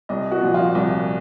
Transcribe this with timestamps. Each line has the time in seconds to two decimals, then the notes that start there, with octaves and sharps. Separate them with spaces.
0.09 C2 D#5
0.31 F#4
0.42 A#2 F3
0.54 F4
0.75 C2